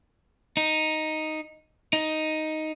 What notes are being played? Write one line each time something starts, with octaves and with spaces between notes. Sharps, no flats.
D#4
D#4